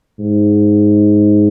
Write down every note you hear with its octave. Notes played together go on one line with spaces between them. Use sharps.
G#2